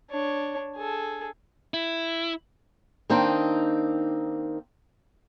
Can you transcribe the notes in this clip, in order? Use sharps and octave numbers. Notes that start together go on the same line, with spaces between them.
D4 C#5
G#4 A4
E4
D#3 A#3 C4 D4 D#4